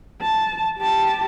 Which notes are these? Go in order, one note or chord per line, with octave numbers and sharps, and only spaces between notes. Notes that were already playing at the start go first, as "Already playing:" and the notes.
A5
G4 A5